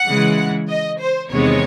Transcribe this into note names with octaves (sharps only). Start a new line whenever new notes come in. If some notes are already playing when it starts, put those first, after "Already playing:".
Already playing: F#5
C#3 E3 G#3
D#5
C5
E2 C3 D#3 G#3 B3 C#5